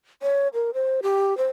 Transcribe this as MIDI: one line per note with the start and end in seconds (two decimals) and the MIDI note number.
0.22 0.48 73
0.54 0.71 70
0.74 1.00 72
1.03 1.37 67
1.38 1.48 72